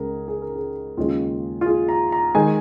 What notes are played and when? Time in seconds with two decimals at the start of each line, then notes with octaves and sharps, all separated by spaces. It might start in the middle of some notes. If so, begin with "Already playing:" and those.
Already playing: C#2 C#3 G#3 G#4 A#4
0.28 G#4
0.42 A#4
0.56 G#4
0.97 D#2 C#3 G#3 F4
1.61 F4
1.66 G#4
1.89 A#5
2.12 A#5
2.35 D#3 G#3 G#5